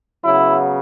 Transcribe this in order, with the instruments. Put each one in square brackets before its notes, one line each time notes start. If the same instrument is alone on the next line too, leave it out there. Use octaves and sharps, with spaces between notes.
[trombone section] C#3 F#3 B3 E4